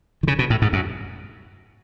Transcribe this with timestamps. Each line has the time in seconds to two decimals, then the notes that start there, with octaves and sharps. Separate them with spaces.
0.23 D#3
0.28 C#3
0.39 B2
0.50 A2
0.62 G#2
0.73 F#2